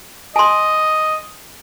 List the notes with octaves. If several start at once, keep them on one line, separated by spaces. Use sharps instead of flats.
D#5 G#5 C6